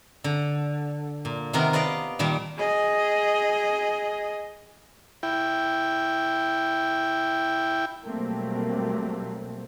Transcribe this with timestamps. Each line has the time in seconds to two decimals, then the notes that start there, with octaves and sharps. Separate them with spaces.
0.24 D3
1.25 A#2
1.53 C3 D#3 B3 A#4 B4
1.73 B4 D5 D#5 F5
2.19 A#2 D#3 G3 A5
2.57 G#4 D#5
5.23 E4 G5
8.07 B2 F#3 G3 A3 A#3 C4